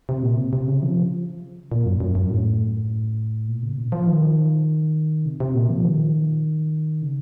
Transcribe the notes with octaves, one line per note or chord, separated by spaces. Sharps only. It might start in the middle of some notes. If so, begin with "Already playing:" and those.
C3
A#2
C3
C3
C#3
F3
A#2
F#2
F#2
F#2
A2
A#2
C#3
A#2
F3
D#3
C3
C3
A#2
F3
D#3
C#3